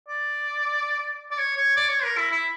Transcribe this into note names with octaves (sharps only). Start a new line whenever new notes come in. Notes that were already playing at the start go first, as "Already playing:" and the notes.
D5
D5
C#5
C#5
D5
C#5
A#4
E4
E4